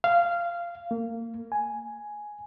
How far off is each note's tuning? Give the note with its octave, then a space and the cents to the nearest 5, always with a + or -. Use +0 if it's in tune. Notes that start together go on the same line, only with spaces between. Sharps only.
F5 -15
A#3 -30
G#5 +5